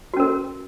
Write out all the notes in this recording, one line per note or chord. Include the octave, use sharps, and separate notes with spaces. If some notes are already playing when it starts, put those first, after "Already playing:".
C#4 F#4 A#4